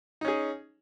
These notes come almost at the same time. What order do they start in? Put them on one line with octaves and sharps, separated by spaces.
D#4 C#4 G#4